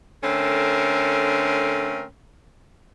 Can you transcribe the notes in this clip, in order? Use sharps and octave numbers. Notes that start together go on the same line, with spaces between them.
D3 A3 C4 C#4 A#4